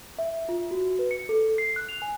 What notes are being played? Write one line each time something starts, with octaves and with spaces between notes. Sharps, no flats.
E5
F4
F#4
B4
C#7
A4
C7
F#6
F7
G#5